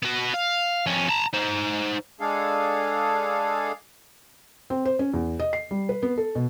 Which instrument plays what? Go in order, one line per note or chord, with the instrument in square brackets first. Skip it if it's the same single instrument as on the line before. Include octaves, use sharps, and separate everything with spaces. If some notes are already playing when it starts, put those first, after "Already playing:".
[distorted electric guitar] B3 F#4
F5
F2 C#4
A5 A#5
D#4 C5
[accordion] G#3 D4 G#4 A4 F5
[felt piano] C4
C5
C#4
E2
D#5
C7
G3
B4
B3
A4
B2